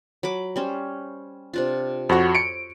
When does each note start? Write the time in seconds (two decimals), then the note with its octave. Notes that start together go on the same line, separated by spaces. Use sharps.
0.23 F#3 B5 D6
0.56 G3 C#4 C5
1.53 C3 D4 F4
2.09 F2 F#4 C5 C#5
2.35 C#7 D7